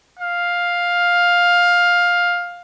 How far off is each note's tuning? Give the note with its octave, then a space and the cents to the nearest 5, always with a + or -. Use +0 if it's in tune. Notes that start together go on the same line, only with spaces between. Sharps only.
F5 +10